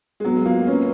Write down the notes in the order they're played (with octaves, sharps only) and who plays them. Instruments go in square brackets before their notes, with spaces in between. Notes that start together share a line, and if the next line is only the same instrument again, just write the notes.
[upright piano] G#3
[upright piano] F#3 [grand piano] B3
[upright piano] G#3
[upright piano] A#3 [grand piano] F4
[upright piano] C#4 [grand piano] B4